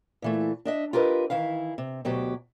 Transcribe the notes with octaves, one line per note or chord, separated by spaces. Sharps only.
A#2 E3 A3
D4 D#5 E5
F4 G4 A#4 B4 D#5
D#3 E3 E4 F5
C3
D2 B2 F#3 G4